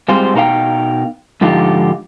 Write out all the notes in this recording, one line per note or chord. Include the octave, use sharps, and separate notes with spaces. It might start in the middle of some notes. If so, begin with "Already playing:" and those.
G3 G#3 C4 F4 C5
B2 D#4 A#4 C5 F5 G5
G#2 D3 F3 D#4 F4 G4